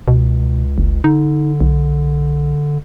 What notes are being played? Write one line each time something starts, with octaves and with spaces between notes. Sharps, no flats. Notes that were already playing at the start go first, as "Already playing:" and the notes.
C#2 B2
F#1
D3 D#4
B1